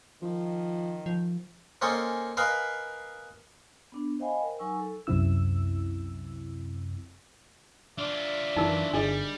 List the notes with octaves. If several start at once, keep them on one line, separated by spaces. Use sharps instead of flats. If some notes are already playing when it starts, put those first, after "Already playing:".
D#3 F3
F3
A#3 C4 C#4 A4 D#5 G#5
A#4 B4 D#5 F5 G#5 B5
B3 D4
C5 D#5 F5 G5 G#5 B5
A#4
F#3 D#4 G#5 C#6 E6
A4
C2 F#2 C3 C4 E4 E6
D4 F4 D5 E5
F#2 D#3 E3 D#4 A#4
G1 G3 D4 G#4 D#5